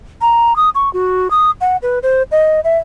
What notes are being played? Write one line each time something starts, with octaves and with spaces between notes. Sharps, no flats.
A#5
D#6
C#6
F#4
D#6
F#5
B4
C5
D#5
E5